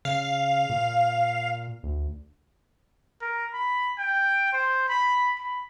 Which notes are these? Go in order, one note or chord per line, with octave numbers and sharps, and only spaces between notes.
C#3 F5
A#2
D2
A#4
B5
G5
C5
B5
B5